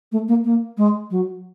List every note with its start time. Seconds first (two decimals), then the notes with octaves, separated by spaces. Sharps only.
0.12 A3
0.28 A#3
0.44 A#3
0.77 G#3
1.10 F#3